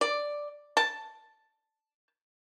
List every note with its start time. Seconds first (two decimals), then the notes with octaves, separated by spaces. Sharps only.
0.01 D5
0.77 A5